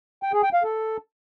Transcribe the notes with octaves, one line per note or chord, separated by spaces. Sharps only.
G5
G#4
G5
F5
A4